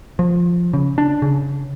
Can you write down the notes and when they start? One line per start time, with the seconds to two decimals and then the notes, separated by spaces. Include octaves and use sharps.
0.19 F3
0.73 C#3
0.98 D4
1.22 C#3